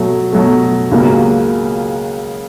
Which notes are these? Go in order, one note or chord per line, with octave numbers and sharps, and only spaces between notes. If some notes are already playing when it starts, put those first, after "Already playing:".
Already playing: B2 F#3 A3
B2 F#3 A3
C#2 C#3 F#3 A#3